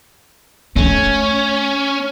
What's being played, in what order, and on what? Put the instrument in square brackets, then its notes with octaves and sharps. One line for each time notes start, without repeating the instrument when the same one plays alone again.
[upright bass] A3 [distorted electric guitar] C#4